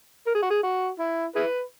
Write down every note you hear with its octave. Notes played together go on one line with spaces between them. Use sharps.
A#4
G#4
F#4
G#4
F#4
E4
E4 G#4 B4